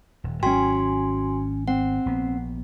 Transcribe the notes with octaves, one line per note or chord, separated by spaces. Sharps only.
D#1
G#1 F#3 C#4 F#4 G5 G#5 C6
C4 F#5
A#1 B3